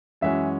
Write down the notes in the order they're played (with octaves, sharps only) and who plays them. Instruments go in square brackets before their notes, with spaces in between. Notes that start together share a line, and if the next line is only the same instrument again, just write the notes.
[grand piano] F#2 E3 G#3 C#4 F#4 [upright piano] E5